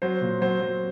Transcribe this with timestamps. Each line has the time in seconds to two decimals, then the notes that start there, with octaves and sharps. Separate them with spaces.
0.02 F#3 C5
0.21 A#2
0.41 F#3 C5
0.61 F#3